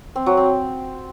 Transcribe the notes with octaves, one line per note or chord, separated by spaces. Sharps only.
C4
F#3
C4